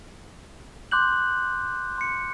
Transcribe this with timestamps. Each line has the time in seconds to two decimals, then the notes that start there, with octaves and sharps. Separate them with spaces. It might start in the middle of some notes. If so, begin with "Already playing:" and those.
0.91 C6 D6 F#6 G6 F#7
1.98 C6 C#7